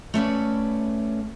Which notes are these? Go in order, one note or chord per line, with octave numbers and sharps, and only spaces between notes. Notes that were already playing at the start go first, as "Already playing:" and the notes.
A3 C#4 B4 D5